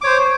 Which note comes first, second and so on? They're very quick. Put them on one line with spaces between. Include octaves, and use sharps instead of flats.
D6 C#5 C5